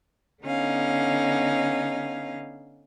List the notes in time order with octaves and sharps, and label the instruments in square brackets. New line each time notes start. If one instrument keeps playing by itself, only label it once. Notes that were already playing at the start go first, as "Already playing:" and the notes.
[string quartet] D3 B3 C#4 D#4 F5